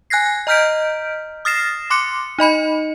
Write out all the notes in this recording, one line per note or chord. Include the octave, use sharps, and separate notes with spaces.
G#5 F#6 G#6 A#6 C7
D#5 A#5 F6 G6 B6 D7
D#6 F6 A6 A#6 C7 E7
C6 D6 F#6 C#7
D#4 D#5 B5 C#7